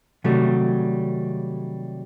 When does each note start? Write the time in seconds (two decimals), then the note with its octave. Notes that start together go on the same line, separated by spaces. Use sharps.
0.24 C3 D#3 F#3 G3 A3